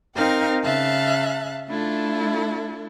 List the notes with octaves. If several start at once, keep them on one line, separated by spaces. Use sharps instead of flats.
C4 D#4 A#4 F5 G5 F6
C#3 E5 F5 A5 F#6
A3 D4 E4 F4 A4